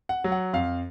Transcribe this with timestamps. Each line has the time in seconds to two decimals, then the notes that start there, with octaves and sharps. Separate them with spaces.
0.09 F#5
0.24 F#3
0.32 F#5
0.53 F2 F5